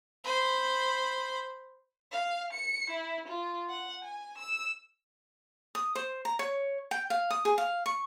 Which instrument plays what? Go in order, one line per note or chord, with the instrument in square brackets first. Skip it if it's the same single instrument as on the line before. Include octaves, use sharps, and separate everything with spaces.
[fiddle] C5 B5
[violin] F5
C#7
E4
F4
F#5
G#5
E6
[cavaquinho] D#6
C5
A#5
C#5
G5
F5
D#6
G#4
F5
C#6